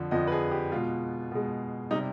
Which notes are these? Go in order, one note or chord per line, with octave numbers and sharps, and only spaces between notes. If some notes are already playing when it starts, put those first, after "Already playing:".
Already playing: F2 D3 F3
F2 D3 F3 D#5
B4
G#4
G4
B2 G#3 F4
B2 G#3
C3 G3 D#4